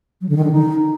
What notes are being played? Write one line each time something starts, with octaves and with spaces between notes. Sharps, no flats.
F#3
D3
D#3
D3
D#4